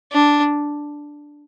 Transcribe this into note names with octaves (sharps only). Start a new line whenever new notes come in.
D4